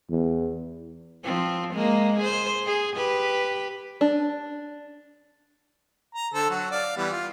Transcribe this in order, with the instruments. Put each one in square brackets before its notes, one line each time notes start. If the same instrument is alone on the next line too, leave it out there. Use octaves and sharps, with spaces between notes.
[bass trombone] E2
[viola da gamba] F3 C4
G#3 A#3
G#4 C5
G#4
G4 B4
[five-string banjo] D4
[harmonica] A#5
D3 A4 C5
F#3 F#4
D5 F5
E3 G3 B3
F4